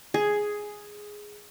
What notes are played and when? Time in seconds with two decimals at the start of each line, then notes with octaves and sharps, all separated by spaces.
0.14 G#4